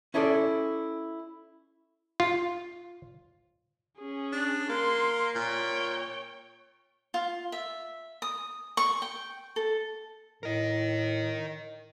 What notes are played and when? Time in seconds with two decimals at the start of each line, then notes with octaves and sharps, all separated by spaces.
0.14 C#4 E4 G#4 A4 C5 D5
2.20 F4
3.98 C#4 G#4
4.32 D4
4.69 A#3 C6
5.35 A#2 C#5 G5
7.14 F4
7.52 E5
8.22 D#6
8.77 C#6
9.02 G5
9.56 A4
10.43 A2 A#4 D#5